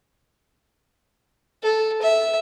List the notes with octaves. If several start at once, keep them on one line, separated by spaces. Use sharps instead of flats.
A4
E5